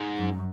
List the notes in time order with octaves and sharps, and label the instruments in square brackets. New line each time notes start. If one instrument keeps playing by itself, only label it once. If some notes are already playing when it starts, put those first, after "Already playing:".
Already playing: [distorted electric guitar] G#2
[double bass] F#2